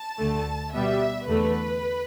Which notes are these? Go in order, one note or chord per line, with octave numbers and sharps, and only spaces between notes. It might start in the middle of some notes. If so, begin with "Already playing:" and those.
Already playing: A5
D2 D3 A3
B2 G3 B3 E5
E2 D3 A3 B4